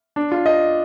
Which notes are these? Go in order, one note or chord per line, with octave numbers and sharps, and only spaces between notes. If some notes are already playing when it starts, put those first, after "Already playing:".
D4
F4
D#5